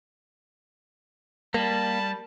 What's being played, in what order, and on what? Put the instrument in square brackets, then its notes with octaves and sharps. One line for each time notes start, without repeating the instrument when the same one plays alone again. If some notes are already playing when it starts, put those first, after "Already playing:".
[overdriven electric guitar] G3 [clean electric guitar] A#3 [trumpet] A5